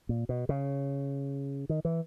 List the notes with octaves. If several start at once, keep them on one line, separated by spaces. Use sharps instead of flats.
A#2
B2
C#3
D#3
E3